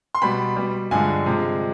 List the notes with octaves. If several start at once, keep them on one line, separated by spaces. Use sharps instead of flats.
C6
B2 G3 B5
B2 G3
G2 D3 F3 G#3 G#5
C3 F3 G#3